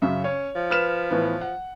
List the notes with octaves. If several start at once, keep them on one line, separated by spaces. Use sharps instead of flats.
F#2 C#3 E5
C#4 C#5
F3
B4 F6 E7
A2 E3 B3
F#5